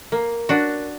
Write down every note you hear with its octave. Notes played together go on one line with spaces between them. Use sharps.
A#3
D4 F#4